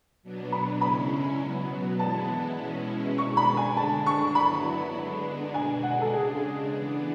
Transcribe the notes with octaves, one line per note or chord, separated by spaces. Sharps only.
B2 F#3 B3 D4
B5
C#3 G#3 C#4 E4 B5
B2 F#3 B3
E3 G#3 B3 E4 A5
B2 G#3 C#4 E4
B2 G#3 D4 C#6
B5
G#5
D3 G#3 D4 A5
C#6
F#3 B3 E4 B5
D3 G#3 B3 D4
B2 G#3 D4 G#5
F#5
A4
C#3 G#3 D4 G#4
E3 B3 D4